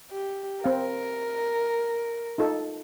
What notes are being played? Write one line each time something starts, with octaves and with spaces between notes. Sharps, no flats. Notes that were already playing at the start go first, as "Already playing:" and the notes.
G4
C4 A#4 F5
D#4 F4 A4